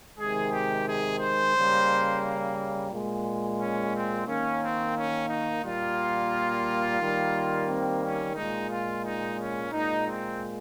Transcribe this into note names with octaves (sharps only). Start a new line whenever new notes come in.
C3 D#3 G#3 G#4
G4
G#4
C5
C#3 G3 A#3
A#2 G#3
C#4
C4
D#3 A#3 C#4
C4
C#4
D#4
A#2 G3 A#3 F4
D#3 G3 A#3
C4
C#4
A#2 G#3 D#4
F4
D#4
C#4
A#2 G#3 D#4
C4